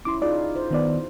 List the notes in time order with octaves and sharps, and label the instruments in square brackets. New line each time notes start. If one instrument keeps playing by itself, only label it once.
[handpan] C#4 E4 [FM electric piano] C6 D6
[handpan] D#4 F4 G#4 [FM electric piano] D5
[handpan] C5
[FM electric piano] D#3 B3 D5